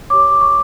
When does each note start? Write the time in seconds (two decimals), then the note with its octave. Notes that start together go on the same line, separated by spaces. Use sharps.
0.10 G4 C#5 D6
0.41 C#6